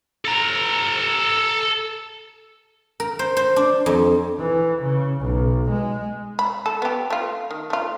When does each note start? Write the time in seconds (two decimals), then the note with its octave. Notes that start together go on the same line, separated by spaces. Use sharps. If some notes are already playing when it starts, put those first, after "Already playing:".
0.25 A4 A#5
3.00 A#4
3.19 C5
3.37 C5
3.56 D4
3.86 F2
4.39 E3
4.82 C#3
5.21 B1
5.70 G#3
6.39 B5
6.66 A4
6.82 B3 G4
7.10 A3 F4
7.51 D#3
7.70 A3 F4